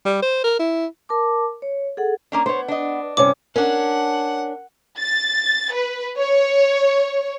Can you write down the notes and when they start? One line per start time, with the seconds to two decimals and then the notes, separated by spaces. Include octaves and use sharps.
0.06 G3
0.22 C5
0.44 A#4
0.59 E4
1.09 A#4 A5 D6
1.62 C#5
1.97 G#4 A4 F#5
2.32 A#3 C#4 D4
2.46 B3 C5 C#5
2.68 D4 D#5
3.17 G2 C3 C#4 D6
3.56 C#4 D4 A#4 F#5
4.98 A6
5.73 B4
6.17 C#5